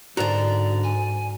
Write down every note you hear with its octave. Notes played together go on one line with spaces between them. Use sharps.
G#2 D3 F#4 A#4 C5 D5 A#5
G#5